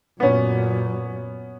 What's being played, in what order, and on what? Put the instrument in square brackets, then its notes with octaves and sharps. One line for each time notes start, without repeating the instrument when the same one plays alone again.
[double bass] F#2 A#2 [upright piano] B3 C#4